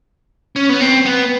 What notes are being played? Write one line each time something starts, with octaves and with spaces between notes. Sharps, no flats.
C#4
B3
C4
B3